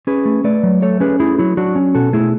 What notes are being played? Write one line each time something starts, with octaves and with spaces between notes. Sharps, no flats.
C#4 G#4 B4
A3
A3 B4 D5
F#3
A3 A4 C#5
C#4 G#4 B4
A3 E4 G#4
F#3 E4
F#3 D4 F#4
C#4
B2 F#4 A4
A3 E4 G#4